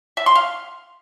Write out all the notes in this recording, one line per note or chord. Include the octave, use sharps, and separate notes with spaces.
E5
C6
F5